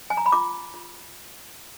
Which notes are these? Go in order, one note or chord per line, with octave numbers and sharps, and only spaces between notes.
G#5
A#5
B5
F4 D6
F4